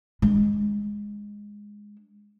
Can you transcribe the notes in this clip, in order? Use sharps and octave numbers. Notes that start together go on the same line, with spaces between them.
G#3 D4